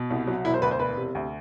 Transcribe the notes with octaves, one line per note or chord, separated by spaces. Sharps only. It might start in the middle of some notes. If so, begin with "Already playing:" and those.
Already playing: B2
C2
F#3
E1 E4
C5
D2 B4
C5
E1 B4
C3
D2